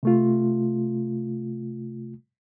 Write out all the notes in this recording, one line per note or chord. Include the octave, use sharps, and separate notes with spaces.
C3 A3 F4